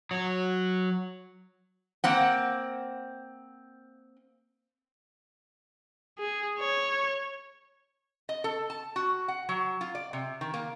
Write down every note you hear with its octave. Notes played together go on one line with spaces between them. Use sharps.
F#3
A#3 C4 F#5
G#4
C#5
D#5
A4
A5
F#4
F#5
F#3
F4
D5
C3
D#3
A#3